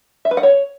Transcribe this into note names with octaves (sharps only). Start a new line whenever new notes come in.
E5
B4
F#5
C#5